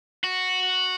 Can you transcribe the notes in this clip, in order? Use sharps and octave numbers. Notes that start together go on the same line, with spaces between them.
F#4